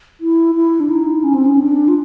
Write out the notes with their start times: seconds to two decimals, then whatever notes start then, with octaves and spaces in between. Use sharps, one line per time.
0.21 E4
0.55 E4
0.80 D4
0.89 D#4
1.24 C#4
1.34 C4
1.46 C#4
1.58 D4
1.88 F4